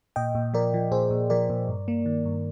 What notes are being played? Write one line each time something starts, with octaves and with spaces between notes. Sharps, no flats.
A#2 D#5 G5
A#2
F3 A#4 D5
F3
A#2 G#4 C5
A#2
F3 A#4 D5
A#2
G2
A#3
D#3
G2